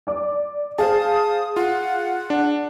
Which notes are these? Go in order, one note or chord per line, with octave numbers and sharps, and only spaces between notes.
D5 D6
G#4 C5 F5 A5 D#6
F4 F#5
D4